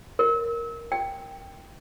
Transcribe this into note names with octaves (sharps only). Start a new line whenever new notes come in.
A#4
G5